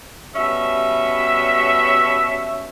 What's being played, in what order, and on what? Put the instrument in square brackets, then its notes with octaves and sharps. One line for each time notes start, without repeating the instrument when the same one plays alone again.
[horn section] B2 G3 C#4 E5